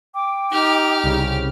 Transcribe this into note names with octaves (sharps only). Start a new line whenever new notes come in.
G5 D6
D#4 G4 F6
C2 C#3